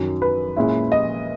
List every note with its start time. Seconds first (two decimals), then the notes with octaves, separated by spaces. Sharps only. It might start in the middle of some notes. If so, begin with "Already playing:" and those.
Already playing: F#2 D#3 F#3 C#4
0.22 B4
0.57 A#2 G#3 C#4 E4
0.92 D#5